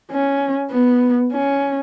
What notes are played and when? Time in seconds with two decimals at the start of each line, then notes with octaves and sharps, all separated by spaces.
0.11 C#4
0.71 B3
1.32 C#4